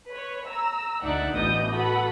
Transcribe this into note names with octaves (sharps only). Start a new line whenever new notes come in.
B4 C#5
A#5 E6
D2 D4 D#4 D5 E5 F#5
A1 B2 E3 D#5 D#6 G6
F#4 A4 B4 F#5 B5